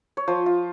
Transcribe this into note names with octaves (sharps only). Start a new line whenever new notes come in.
C#5
F3 C5
F4